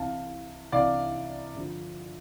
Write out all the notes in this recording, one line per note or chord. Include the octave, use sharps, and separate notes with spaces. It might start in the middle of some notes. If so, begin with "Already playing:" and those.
Already playing: C2 C3 E3 F5 A5
C2 C3 E3 D5 F5
G2 D3 F3